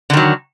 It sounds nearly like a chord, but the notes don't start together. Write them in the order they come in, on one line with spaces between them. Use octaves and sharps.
D3 D#3 F#3